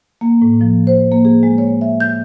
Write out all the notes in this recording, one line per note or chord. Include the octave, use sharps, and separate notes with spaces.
A#3
A2
F3
C5
A#3
G#4
G#3
C#5
E5
G6